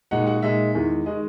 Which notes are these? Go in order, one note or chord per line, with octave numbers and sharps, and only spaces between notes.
A#2 G#3 D#4 F#4 F#5
F#4 F#5
A#2 G#3 D#4 E5
E2 D#3 G#3
D#3 G#3 D#5